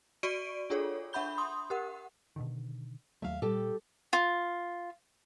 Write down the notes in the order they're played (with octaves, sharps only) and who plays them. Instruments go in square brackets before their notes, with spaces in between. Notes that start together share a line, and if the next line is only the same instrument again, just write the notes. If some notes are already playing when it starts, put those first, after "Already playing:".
[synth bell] F#4 D5 C#6 D7 D#7
D4 F4 G#4 A4 C#5
D4 E5 F#5 B5 G6 G7
C6 D#6
G4 A#4 F#5
[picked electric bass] B2 D3 D#3
[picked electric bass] D#2 F#3 A3 [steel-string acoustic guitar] E5 F5
[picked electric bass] A#2 [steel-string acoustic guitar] G3 G4 A4
[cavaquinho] F4